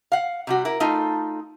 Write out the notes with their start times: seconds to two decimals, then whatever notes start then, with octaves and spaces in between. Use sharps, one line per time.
0.12 F5 F#5
0.47 C3 G3 F#4
0.65 E4 A#4
0.80 A3 D#4 F4 A4